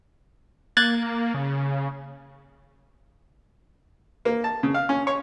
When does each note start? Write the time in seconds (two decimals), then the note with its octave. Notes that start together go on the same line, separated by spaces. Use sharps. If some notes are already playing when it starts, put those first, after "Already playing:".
0.77 A#3 F#6 G#6 A6
1.34 C#3
4.25 A#3
4.44 A5
4.63 C#3
4.74 F5
4.89 C#4
5.07 C#5